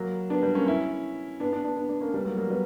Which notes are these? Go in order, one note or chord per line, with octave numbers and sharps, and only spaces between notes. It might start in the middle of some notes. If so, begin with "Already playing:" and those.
Already playing: F#3 A#3
B3 D4
G3 B3
A#3 C#4
C#4 E4
B3 D4
B3 D4
B3 D4
B3 D4
B3 D4
A#3 C#4
G3 B3
F#3 A#3
F#3 A#3
G3 B3